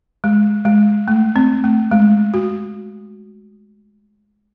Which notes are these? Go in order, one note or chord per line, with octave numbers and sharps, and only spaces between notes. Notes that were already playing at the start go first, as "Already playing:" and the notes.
G#3
G#3
A3
C4
A3
G#3
F#4